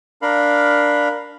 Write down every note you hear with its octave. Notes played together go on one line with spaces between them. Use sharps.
D4 A#4 F5 B5